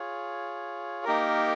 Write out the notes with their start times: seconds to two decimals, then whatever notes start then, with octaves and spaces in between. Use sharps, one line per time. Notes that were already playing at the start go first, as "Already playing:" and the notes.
Already playing: F4 G#4 C#5
1.04 A#3 D#4 G4 A#4